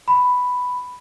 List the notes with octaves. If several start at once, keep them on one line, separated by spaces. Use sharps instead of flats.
B5